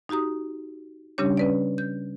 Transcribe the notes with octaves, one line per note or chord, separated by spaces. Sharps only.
D#4 F#4 G4 A#5 D#6
C#3 G3 C#4 D4 G4 C#5
C#4 B4 D5
G6